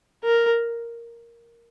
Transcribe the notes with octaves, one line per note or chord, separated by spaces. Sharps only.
A#4